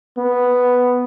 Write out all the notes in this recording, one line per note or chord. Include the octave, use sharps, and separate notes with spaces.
B3